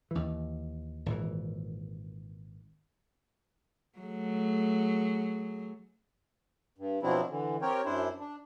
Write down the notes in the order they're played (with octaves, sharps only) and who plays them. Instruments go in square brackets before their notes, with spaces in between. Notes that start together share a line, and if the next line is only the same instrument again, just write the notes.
[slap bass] D#2 E3
G#1 A#2 E3
[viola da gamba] F#3 A3 G#4
[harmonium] G2
B2 F3 F#3 C4 D4 E4
D3 E3
C4 G4 A#4 C#5 G5
F#2 D4 E4 C5
D4